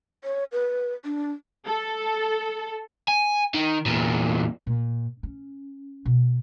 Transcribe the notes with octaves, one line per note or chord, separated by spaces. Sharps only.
C#5
B4
D4
A4
G#5
D#3
E2 A#2
A#2
C#4
B2